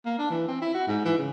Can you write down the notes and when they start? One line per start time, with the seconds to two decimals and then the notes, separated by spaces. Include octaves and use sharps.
0.05 A#3
0.19 D4
0.30 E3
0.48 C4
0.62 E4
0.74 F#4
0.88 G#2
1.05 E3
1.18 C#3